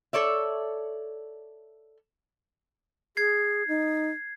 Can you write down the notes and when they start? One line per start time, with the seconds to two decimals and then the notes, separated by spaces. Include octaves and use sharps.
0.13 A4 C#5 D5 E5
3.17 G#4 G#6 C7
3.68 D#4